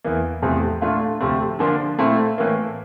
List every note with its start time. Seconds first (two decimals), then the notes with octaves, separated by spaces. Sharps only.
0.04 E2 E3 A#3
0.42 E2 C3 F3 A3
0.81 A#2 A3 D4 F4
1.20 D2 C3 F3 A3 C4
1.59 D3 F3 A#3 D4 F4
1.99 A#2 A3 C4 E4
2.38 A2 E3 A#3